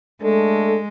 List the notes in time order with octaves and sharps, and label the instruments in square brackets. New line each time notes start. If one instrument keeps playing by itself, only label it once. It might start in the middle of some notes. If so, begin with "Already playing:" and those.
[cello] G#3 [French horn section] A3 D4 A4